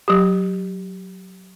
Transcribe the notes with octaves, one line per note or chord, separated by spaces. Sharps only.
F#3 G4